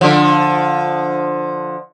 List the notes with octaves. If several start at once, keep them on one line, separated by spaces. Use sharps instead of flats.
D3 F3